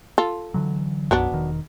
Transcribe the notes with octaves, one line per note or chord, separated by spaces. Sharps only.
F4 A4
D3 E3 F#3
B1 F#2 F#3 B3 D4
E1 D#3